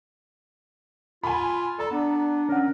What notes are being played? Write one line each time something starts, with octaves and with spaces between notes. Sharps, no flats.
F4 G#5 B5
A4 D5 A#5
B3 D4
C#4 A#4 F#5